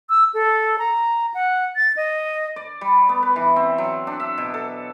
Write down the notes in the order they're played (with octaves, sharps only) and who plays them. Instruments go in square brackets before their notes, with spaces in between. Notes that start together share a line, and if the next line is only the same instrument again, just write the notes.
[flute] E6
A4
A#5
F#5
A6
D#5
[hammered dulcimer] D5
G3
B3
B4
E3
C4
F#3
D4
E5
B2
A4